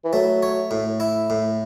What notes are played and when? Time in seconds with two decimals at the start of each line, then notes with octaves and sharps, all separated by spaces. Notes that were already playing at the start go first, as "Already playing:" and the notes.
0.04 E3
0.13 F#3 A3
0.43 C#5
0.71 A2
1.00 E4
1.30 A2